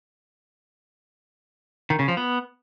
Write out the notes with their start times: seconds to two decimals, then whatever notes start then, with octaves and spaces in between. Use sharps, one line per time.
1.90 D#3
1.99 C#3
2.08 F3
2.17 B3